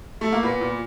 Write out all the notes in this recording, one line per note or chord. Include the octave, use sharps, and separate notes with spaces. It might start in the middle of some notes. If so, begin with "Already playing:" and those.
A3
A#3
A#2 B3
A#2